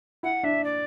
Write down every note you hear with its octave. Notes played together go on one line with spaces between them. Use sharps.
E4 F#5
D4 E5
D5